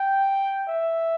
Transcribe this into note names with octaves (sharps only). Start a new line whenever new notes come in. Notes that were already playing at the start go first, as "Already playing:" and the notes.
Already playing: G5
E5